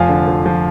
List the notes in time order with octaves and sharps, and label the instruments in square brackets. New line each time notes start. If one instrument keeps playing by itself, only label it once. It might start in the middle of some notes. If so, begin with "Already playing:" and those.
Already playing: [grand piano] F1 F3 F5 G#5
D3
F3
F3